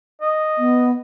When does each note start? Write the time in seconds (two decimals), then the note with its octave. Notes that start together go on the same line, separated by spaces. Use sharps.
0.22 D#5
0.58 B3